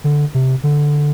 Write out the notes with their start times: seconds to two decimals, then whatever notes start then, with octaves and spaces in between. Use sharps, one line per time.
0.04 D3
0.34 C3
0.64 D3